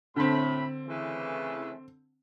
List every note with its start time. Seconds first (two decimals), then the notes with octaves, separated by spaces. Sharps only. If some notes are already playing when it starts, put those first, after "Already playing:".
0.16 A2 D3 C4 B5
0.87 C#3 E3 A3